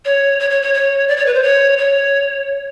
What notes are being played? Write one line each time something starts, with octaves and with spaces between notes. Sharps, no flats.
C#5
C#5
C#5
C#5
C#5
D5
C#5
B4
C5
C#5
C#5